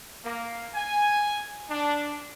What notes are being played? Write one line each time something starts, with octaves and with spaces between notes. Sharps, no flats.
A#3
G#5
D4